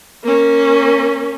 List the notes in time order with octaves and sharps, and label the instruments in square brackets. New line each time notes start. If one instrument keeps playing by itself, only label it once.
[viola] A#3 C#4